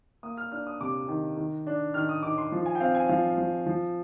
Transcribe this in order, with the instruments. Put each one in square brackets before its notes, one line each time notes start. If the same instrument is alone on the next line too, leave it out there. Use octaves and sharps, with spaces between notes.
[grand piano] A#3 D#6
F6
D4 F6
D#6
C3 D6
D#3
D#3
D4
D#3 F6
D#6
D#3 D6
C6
F3
G#5
G5
C4 F5
G#5
F3 F5
F3
F3